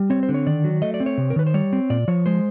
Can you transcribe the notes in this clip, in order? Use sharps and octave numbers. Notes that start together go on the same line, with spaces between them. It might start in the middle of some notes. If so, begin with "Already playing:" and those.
Already playing: G3
C4 C#5
C5
D3
C#5
D#3 D5
F#3
A3 D#5
D5
C4
C#5
C3
A#4
D#3 B4
C5
G3 C#5
C4
A#2 D5
F3 C#5
G#3 C5